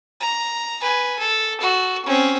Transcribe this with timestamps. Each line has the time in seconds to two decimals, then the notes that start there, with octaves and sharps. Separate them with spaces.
0.21 A#5
0.81 B4 G#5
1.19 A4
1.60 F#4 A4
2.05 C4 C#4